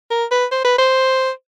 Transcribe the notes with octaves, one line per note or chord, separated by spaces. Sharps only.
A#4
B4
C5
B4
C5